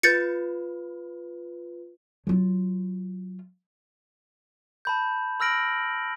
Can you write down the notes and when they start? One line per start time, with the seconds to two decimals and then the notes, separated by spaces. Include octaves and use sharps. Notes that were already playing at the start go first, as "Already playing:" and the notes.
0.03 F4 B4 G6 A6 C#7
2.27 F#3 F4
4.85 A5 B5 G6
5.40 B5 E6 F6 A#6 D7 F#7